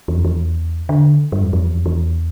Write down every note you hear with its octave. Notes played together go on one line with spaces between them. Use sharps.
E2
F2
E2
D3
G2
F2
F2
E2
F2
E2